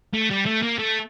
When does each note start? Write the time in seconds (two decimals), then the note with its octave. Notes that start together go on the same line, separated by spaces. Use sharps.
0.14 A3
0.30 G3
0.46 A3
0.62 A#3
0.78 A3